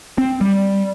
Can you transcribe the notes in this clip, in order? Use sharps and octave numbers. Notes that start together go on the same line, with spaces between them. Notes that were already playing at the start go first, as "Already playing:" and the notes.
C4
G3